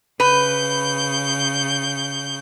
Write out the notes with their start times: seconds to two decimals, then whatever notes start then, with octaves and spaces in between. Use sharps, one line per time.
0.20 C#3 B4 G6